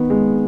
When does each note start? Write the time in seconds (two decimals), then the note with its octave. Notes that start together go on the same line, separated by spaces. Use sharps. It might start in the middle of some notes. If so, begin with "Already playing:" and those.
Already playing: D#3 B3
0.10 G#3